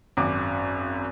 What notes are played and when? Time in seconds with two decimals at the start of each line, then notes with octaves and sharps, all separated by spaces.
0.17 G#1 F#2 F#4 D6